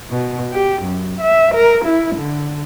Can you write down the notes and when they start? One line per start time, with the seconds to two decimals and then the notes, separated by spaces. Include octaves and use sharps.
0.10 B2
0.52 G4
0.83 F#2
1.20 E5
1.55 A#4
1.85 E4
2.15 D3